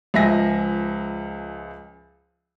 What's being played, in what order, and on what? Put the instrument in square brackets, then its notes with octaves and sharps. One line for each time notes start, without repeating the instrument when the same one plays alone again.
[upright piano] C#2 F3 E5 G#5 A#6